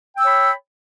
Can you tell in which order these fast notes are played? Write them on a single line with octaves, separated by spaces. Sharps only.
G5 E6 C#5 B5